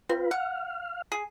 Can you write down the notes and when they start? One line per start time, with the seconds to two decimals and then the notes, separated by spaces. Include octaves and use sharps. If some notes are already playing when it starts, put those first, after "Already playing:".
0.09 C4 F4 B4
0.31 F5 F#5
1.12 G#4